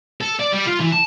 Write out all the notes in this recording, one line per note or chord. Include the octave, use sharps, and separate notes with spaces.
A4
D5
G3
F4
E3
A5